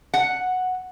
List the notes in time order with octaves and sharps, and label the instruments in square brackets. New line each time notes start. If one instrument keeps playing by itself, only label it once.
[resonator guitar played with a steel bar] F#5